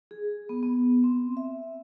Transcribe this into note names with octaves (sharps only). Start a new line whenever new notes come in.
G#4
B3
B3
C4
E5